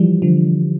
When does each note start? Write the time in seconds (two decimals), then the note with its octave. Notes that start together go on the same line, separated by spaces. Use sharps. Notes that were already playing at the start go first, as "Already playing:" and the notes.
Already playing: E3 F3 G3
0.22 D3 F3